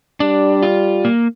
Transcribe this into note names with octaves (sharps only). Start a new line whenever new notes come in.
G3 D4
F4
A#3